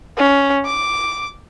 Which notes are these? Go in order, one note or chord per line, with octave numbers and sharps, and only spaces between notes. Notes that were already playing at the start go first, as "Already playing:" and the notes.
C#4
D6